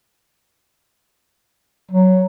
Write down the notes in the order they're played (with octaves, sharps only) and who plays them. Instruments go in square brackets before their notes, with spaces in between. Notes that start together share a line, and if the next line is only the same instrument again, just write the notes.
[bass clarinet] F#3